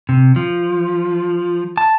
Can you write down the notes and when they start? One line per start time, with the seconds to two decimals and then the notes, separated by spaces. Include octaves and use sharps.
0.09 C3
0.36 F3
1.78 A5